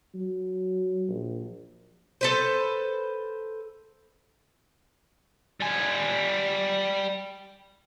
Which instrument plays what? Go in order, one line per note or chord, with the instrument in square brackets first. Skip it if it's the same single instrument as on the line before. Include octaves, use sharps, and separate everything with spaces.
[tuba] F#3
A#1
[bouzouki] A4 B4 C5
[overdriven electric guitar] G3 G#5